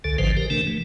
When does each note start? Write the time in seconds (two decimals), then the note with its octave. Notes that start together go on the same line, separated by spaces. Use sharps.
0.04 C#2 D3 A4
0.18 G#1 G#2 D3 F3 B4 C5
0.37 G4 A#4
0.50 C3 E3 A3 D4 A#4
0.67 E3 A3